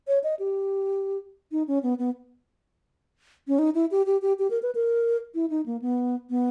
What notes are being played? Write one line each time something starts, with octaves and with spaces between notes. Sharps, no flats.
C#5
D#5
G4
D#4
C#4
B3
B3
C#4
D#4
E4
G4
G4
G4
G4
A#4
B4
A#4
E4
D#4
A#3
B3
B3